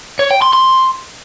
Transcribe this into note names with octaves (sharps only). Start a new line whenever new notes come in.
C#5
G5
C6
C6